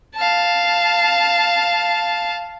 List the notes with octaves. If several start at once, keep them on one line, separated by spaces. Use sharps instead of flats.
F5 A5